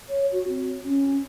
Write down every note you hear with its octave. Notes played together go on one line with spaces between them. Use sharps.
C#5
F#4
C4
C#4